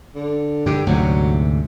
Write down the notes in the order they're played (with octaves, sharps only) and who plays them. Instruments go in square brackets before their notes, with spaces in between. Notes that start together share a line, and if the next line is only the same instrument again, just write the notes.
[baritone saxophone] D3
[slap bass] G2 D3 [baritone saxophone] G4
[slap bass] D2 G#2 C3 [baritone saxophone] F#3